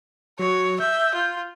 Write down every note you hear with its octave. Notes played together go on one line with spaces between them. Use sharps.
F#3 C#5
E5 G6
F4